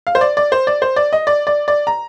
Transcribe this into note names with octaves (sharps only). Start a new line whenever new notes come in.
F5
C5
D5
D5
C5
D5
C5
D5
D#5
D5
D5
D5
A#5